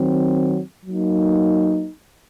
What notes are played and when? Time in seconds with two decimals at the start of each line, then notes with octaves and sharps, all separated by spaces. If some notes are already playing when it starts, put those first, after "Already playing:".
Already playing: D#3 F#3 C4
0.85 F#3 A#3 D#4